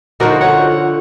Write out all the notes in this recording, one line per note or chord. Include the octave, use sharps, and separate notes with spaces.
D3 F3 D#4 F#4 A#4
C#5 F#5